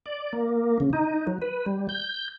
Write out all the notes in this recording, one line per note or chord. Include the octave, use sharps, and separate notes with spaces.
D5
A#3
C#3
D#4
F#3
B4
G3
G6